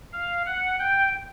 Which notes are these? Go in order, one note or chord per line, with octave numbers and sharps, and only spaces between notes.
F5
F#5
G5